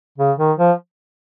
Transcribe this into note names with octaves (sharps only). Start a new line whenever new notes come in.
C#3
D#3
F3